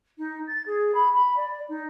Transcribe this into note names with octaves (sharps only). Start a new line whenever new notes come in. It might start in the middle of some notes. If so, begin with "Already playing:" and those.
D#4
A6
G#4
B5
B5
D5
D#4